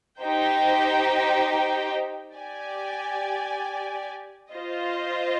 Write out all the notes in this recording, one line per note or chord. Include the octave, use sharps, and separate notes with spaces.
D#4 G4 C5 G5
G4 D5 G#5
F4 C5 D#5